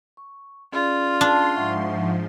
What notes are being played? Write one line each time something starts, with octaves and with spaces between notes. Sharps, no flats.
C#6
C#4 F4 G#4 D5
D4 C6
G#2 F3 E5 F#5 C#6